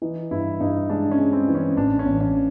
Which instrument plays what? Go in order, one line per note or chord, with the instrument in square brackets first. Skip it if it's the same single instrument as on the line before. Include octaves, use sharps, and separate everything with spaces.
[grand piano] E3 [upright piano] D#4
[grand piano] G2 [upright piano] E4
[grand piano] G2 [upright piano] D#4
[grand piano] G#3 [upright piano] D4
[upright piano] C#4
[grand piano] G#3
[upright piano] C4
[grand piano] E3
[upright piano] C#4
[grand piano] A1 [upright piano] D4
[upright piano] C#4
[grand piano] A1
[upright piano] C#4